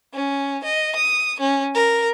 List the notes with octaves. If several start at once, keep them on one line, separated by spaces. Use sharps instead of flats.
C#4
D#5
D#6
C#4
A#4